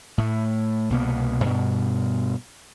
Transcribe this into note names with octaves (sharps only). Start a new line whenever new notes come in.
A2 A3
C2 B2 A#3 B3
G2 B2